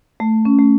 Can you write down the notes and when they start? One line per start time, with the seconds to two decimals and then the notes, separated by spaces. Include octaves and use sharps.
0.20 A3
0.45 C#4
0.59 A3